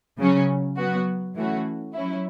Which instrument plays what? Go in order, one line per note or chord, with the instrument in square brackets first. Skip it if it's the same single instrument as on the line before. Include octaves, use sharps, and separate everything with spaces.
[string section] C#3 F#3 C#4
F#3 B3 F#4
E3 A3 C#4 F#4
F#3 C#4 E4